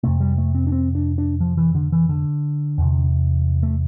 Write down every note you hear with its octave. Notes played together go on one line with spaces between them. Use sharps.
F2 C3 A3
G3
A3
C4
D4
C4
D4
D4
F3
E3
D3
E3
D3
E2 C3
A3